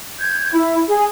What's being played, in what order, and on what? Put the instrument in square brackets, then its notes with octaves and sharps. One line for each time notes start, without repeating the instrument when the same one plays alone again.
[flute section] G6 G#6
E4
G#4